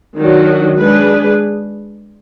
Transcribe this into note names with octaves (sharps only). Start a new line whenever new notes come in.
D#3 F#3 D4 F#4
G#3 D4 G#4 B4